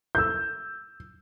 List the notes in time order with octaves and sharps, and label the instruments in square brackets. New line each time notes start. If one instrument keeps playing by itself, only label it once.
[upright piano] E6 G6